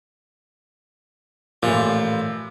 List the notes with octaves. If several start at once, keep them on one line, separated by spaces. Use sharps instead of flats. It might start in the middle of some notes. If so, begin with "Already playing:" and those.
A1 A#2 F3